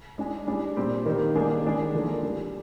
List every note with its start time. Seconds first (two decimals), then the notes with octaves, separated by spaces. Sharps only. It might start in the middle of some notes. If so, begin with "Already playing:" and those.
0.18 G#3 D4 G#4
0.47 G3 D4 G#4
0.77 A#2 G3 C4 G4
1.06 D#3 A#3 D#4 G4
1.35 D#3 G3 A#3 D4 G#4
1.64 D#3 G#3 D4 G#4
1.94 D3 F3 A#3
2.23 G3 D4 G4